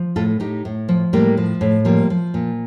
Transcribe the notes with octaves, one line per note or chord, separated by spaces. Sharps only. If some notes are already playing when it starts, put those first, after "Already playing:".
Already playing: F3
A2 F4 A4
A2 D#4 G4
A2
F3
A2 G3 A#3
F3
A2
F3 G3 A#3
F3
A#2